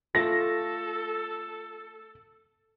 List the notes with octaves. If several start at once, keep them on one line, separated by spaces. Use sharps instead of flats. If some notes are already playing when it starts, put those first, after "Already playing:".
A3 F4 A4 D6 A#6